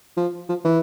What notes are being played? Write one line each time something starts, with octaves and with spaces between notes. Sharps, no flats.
F3
F3
E3